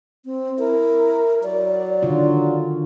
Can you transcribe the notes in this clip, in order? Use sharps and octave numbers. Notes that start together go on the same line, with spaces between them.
C4
E4 A#4
F#3 D5
D3 D#3 F4